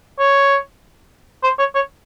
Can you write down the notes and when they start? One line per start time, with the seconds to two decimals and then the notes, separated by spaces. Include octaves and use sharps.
0.19 C#5
1.43 C5
1.59 C#5
1.75 C#5